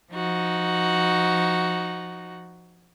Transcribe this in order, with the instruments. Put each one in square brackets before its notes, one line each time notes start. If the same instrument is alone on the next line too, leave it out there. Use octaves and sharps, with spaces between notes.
[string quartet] F3 D#4 F#4